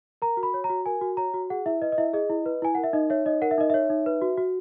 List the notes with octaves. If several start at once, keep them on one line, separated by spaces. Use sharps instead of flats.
A#4 A#5
F#4
B5
C#5
A#5
F#4
A#4 G#5
F#4
C#5 A#5
F#4
G#4 F#5
E4 E5
B4 D#5
D#5
E4 E5
G#4 D#5
E4
B4
E4 G#5
A#4 F#5
E5
D#4 D#5
C#5 E5
D#4 D#5
A#4 F#5
E5
D#4 D#5
C#5 E5
D#4
B4
F#4
F#4